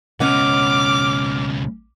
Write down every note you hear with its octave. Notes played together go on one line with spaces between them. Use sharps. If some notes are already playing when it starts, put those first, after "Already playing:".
C#2 B2 C#4 D#5 F#5 D6 F6